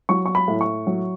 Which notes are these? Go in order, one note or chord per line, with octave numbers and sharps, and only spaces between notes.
F#3 C#6
C#6
B5
A2
C#6
F#3